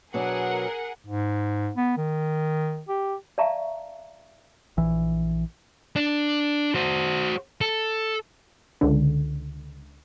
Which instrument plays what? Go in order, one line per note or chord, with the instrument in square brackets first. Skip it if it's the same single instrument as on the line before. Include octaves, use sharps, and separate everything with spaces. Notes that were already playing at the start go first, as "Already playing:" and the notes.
[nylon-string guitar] B2 F#3 D4 [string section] G#4 A#4 F#5
[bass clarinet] G#2
B3
D#3
G4
[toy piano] D5 E5 F5 A5 A#5 C#6
[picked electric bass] A#1 E3
[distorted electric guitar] D4
F#4 C5
A4
[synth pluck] C#2 D3